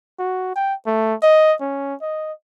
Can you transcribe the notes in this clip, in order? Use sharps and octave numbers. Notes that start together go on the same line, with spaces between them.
F#4
G5
A3
D#5
C#4
D#5